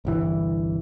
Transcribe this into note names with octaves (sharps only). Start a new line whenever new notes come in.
G1 C2 E3